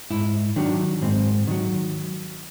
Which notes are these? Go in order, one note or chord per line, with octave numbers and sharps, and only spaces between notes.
G#2 E4
D#3 F#3 D4
G#2 C4
D#3 F#3